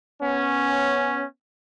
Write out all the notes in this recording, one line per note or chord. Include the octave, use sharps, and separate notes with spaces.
B3 C#4